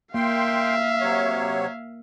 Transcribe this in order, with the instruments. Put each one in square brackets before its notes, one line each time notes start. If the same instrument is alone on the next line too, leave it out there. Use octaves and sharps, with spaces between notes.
[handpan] A#3 [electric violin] E5 F5 [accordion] G5 C6
[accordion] C3 F#3 C#5